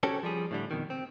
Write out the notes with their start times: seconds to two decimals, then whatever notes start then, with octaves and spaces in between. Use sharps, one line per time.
0.03 C#4 F#4 G4 A4 C5 C#5
0.23 F3 G3 G#4
0.51 A2 D3 G3
0.71 F2 B2 D#3
0.90 C4